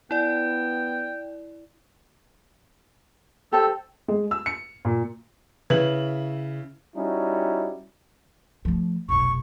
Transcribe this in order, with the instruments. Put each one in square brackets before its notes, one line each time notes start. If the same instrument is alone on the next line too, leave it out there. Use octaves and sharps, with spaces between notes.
[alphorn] B3 [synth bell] E4 D5 [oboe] G5
[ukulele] G4 C5 A5 [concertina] A4
[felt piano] G#3
E6
C#7
A#2
[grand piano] C#3 E4 F#7 [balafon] B4
[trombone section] G3 C#4 D#4 E4 F#4
[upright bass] F3 A3
[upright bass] F1 B1 [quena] C#6